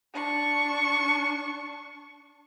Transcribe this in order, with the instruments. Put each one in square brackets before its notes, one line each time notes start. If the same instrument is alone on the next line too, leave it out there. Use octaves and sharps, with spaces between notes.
[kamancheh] D4 C#6